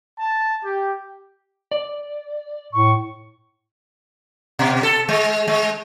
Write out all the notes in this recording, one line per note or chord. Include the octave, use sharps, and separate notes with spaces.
A5
G4
D5
A2 C#6
B2
A4
G#3
G#3